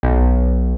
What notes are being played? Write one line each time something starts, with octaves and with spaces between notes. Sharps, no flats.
B1